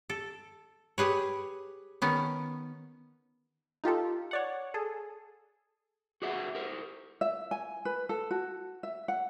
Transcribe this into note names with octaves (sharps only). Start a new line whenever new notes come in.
A4
G4 G#4 B4 C#5
D#3 B3 C#4
D#4 F4 G4 A4
C#5 D5 F#5
G#4 A4
F#4 G#4 D5 E5 F#5
G4 A#4 C5
E5
G#5
B4
A4
F#4
E5
F#5